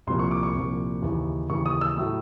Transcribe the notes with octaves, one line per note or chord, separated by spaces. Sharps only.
C2 A#2 F3 C6
C#6
D6
C#6
C2 A#2 F3
D#2 C#3 E3
D#2 C#3 E3 C#6
D#6
E6
A2 F#3 A3